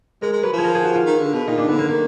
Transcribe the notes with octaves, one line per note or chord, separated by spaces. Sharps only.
G#3 A#4
G#3
F#3 B4
F3
G#4
A#4
G#4
F#4
F4
D#3
D3
B2
A#2 D#4
D4
D3 B3
A#3
D#3 A#3